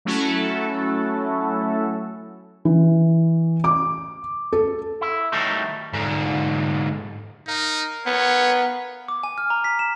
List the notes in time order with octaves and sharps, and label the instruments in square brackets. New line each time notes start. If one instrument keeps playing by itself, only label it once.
[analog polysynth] F#3 A3 C#4 E4 F#4 A4
[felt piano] E3
D6
A4
[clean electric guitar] E4
D#3 F#3 G3 A3 D#4 E4
[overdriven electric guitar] G#2 D3
[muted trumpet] D#4 [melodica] A#4 F5
[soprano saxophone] B3 [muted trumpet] C#5
[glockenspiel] D6
G#5
F6
A#5
B6
E7